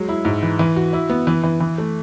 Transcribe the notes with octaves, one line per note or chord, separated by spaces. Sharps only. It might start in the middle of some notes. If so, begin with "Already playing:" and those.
Already playing: F#3 G#3
E4
G#2
E3
E3
F#4
E4
B3
E3
E3
E3
A3